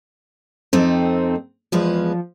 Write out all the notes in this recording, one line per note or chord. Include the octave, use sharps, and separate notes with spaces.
F2 A3 C4 D#4
E2 F3 G#3 B4